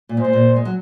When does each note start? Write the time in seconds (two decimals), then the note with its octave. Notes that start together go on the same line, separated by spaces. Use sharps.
0.09 A#2
0.17 G#2
0.21 A#2 C5
0.33 A#2
0.56 G#3
0.65 F#3